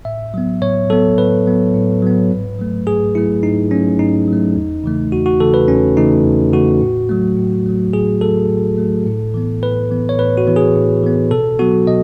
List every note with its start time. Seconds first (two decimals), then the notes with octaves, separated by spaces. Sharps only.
0.05 A2 E5
0.34 F#3 B3
0.62 A2 C#5
0.90 F#3 B3 A4
1.18 A2 B4
1.47 F#3 B3
1.74 A2
2.02 F#3 B3
2.31 G#2
2.59 F#3 A3
2.87 G#2 G#4
3.15 F#3 A3 E4
3.43 G#2 D#4
3.71 F#3 A3 C#4
3.99 G#2 D#4
4.28 F#3 A3
4.56 E2
4.84 C#3 E3 A3
5.11 E2 F#4
5.26 F#4
5.40 C#3 E3 A3 A4
5.54 B4
5.68 E2 C#4
5.97 C#3 E3 A3 D#4
6.25 E2
6.53 C#3 E3 A3 F#4
6.81 A2
7.09 F#3 A3
7.37 A2
7.66 F#3 A3
7.93 A2 G#4
8.21 F#3 A3 A4
8.50 A2
8.78 F#3 A3
9.06 A2
9.34 E3 B3
9.62 A2 B4
9.90 E3 B3
10.09 C#5
10.18 A2 B4
10.37 F#4
10.47 E3 B3
10.56 G#4
10.76 A2
11.03 E3 B3
11.31 B2 A4
11.59 F#3 B3 F#4
11.87 B2 D#5